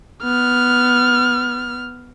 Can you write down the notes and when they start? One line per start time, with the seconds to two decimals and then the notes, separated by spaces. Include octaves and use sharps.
0.24 B3 F6